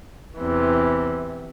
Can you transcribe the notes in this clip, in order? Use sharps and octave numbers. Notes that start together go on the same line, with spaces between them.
E2 C3 E3